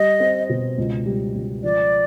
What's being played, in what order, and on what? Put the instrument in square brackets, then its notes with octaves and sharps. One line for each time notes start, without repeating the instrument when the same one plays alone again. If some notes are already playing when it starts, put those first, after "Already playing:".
Already playing: [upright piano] G3 [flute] D#5
[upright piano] C4
B2
C#2
G3
C#2
[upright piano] F3 [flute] D5